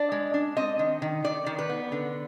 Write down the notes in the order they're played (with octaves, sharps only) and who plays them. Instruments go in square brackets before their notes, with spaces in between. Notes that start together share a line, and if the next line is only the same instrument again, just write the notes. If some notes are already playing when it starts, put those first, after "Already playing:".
Already playing: [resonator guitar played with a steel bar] D4 D5
G#3
D4
C4 D#5
D#3
D#3
D#3 D5
D#3
B4
B3
D3